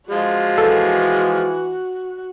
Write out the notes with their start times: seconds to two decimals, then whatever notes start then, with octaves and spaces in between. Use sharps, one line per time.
0.10 F3 G#3 F#4
0.58 E3 A4